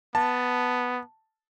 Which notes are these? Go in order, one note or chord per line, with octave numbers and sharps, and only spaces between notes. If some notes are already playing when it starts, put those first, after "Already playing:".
B3 A5